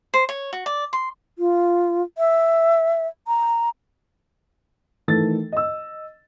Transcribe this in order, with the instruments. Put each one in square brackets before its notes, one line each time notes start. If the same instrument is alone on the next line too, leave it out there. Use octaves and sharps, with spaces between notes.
[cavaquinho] C5
C#5
F#4
D5
C6
[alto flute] F4
E5
A#5
[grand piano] D#3 E3 A3 A4 A6
D#5 E6